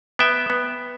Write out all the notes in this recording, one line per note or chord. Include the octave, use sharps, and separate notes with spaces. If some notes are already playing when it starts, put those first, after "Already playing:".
B3 E5 G5
B3